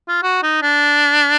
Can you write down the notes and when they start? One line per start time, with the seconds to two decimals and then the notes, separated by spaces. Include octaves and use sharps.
0.08 F4
0.23 F#4
0.43 D#4
0.62 D4